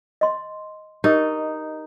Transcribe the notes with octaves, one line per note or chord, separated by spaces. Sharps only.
D#5 C6
D#4 G4 A#4 D#5